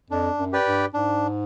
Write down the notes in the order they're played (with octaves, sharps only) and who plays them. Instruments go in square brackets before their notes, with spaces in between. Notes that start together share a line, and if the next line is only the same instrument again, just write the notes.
[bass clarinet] F2 [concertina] D4
[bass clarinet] F#2
[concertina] G4 B4 D5 G5
[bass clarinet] G2
[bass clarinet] G#2 [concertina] D4